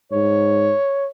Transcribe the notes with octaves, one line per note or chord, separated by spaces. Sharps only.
G#2 C#5